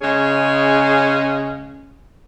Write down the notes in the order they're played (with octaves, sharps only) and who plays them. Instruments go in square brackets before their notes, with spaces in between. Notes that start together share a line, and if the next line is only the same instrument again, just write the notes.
[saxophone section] C#3 G#3 C#4 G#4